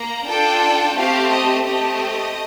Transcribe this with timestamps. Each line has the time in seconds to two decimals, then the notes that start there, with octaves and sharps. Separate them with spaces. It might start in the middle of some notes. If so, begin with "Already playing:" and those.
Already playing: A#3 A#5
0.26 D4 F4 A4 G5
0.96 A3 C4 G4 F5
1.30 D#5
1.65 A3 C4 G4 D#5